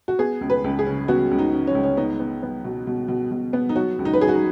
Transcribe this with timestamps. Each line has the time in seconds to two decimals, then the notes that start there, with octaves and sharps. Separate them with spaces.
0.08 F#4
0.19 B3 G#4
0.41 C#2
0.50 B4
0.64 C#2
0.79 G#4
0.86 C#3
1.08 B3 F#4
1.31 C#2
1.39 D#4
1.53 C#3
1.67 C#4
1.75 C#2
1.83 C#4
1.97 B3 D#4
2.20 B3
2.43 B3
2.64 B2
2.87 B2
3.08 B2
3.31 B2
3.53 B3
3.69 D#4
3.75 F#3 F#4
3.99 C#2
4.05 D#4
4.13 B4
4.20 F#3 G#4
4.28 F#4
4.35 D#4